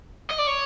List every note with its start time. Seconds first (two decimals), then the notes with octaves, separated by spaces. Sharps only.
0.31 D#5
0.39 D5
0.48 C#5